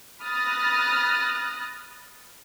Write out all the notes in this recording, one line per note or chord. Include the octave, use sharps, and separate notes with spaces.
B5 D#6 F6 F#6 A6 A#6